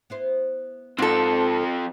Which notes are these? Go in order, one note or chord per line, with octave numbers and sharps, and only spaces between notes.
B3 E4 C5
G#2 F3 C4 A4